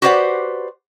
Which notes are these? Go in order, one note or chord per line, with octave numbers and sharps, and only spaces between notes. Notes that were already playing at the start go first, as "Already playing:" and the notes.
F#4 G4 B4 C5 D5 F#5